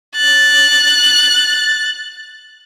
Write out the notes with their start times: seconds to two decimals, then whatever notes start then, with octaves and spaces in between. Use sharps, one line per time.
0.15 F#6 A6